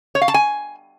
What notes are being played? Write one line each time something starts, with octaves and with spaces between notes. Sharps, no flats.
C#5
F5
A5
G#5